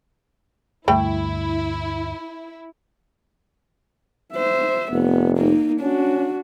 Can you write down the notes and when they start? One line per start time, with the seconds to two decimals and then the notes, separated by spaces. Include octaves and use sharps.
0.88 D2 G2 A3 E4 G5 B5
4.33 C5 E5
4.92 F1 B3
5.37 A#3 D#4
5.80 C#4 D4 F#4